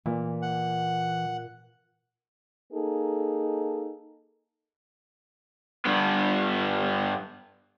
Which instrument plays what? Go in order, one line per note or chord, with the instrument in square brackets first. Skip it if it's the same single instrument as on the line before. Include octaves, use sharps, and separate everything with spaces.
[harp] A#2 [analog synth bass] E3
[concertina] F#5
[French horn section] A#3 D#4 G#4 A4
[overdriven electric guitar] G2 B3